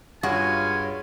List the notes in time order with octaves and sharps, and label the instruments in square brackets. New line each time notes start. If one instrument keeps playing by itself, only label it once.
[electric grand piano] G2 [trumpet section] F4 C#5 [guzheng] F#4 G#4 [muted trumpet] G#5